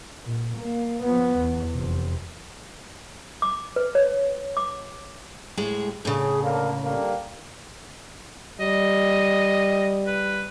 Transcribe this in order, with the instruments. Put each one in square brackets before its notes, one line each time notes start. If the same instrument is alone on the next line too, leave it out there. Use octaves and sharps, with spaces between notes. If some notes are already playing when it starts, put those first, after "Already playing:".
[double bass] A#2
A#3
F3 B3
E2
F1 C3
[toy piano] D6
B4
C#5
D6
[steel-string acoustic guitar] A2 G#3 G#4
[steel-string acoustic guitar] A2 C#3 [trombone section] G#4
[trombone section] D3 A#3
D3 G3 A#3
[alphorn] G3 [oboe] D#5
[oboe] B4